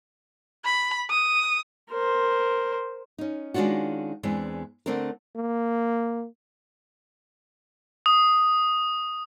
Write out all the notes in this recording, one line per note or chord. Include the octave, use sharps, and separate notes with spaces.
B5
D#6
A#4 C5
C#4 D#4
D#3 G#3 C#4 D4 F4 F#4
E2 E3 G#3 C4 D4
D3 A3 C4 D4 A#4
A#3
D#6